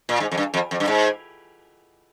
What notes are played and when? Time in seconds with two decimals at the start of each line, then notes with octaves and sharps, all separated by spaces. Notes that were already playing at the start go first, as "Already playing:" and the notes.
0.09 A#2
0.20 G#2
0.32 F2
0.38 G2
0.54 F2
0.71 F2
0.80 G2
0.87 G#2